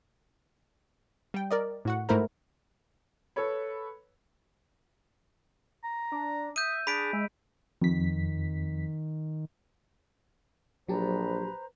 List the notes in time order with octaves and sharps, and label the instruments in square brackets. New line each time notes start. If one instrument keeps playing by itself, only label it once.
[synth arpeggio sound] G3 G5
A#4 D5 D#5
A2 F#4 F#5
G#2 A3 E4 A#4 C5 A#5
[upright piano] A4 B4 C#5 B5
[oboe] A#5
[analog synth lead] D4
[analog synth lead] E5 [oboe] D#6 [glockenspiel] G6 D#7
[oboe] D4 [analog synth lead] G#4 [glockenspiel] B5 B6 D7
[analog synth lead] G#3 [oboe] E5
[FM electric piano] F2 B6 [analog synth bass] D#3
[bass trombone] A#1 [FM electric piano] F#3 G4 A5 [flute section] B4 C5 A#5